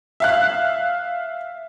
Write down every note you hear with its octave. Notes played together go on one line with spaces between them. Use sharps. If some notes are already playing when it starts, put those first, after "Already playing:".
E5 F5 F#6